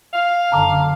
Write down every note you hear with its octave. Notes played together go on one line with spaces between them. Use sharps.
F5
F#1 D3 A5 A#5 D6